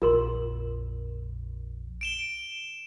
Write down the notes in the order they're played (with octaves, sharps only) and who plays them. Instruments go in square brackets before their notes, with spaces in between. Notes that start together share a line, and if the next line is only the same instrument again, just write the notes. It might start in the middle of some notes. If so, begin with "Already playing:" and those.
[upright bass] A#1 F2 [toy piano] F4 A#4 C6
[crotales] D7 E7 G7